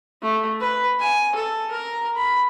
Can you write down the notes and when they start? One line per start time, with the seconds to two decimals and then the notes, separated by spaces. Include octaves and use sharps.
0.22 A3
0.61 B4
0.99 G#5
1.35 A4
1.71 A#4 A#5
2.16 B5